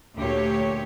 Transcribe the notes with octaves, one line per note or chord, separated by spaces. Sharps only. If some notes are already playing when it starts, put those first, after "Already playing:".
D2 A#2 G4 C#5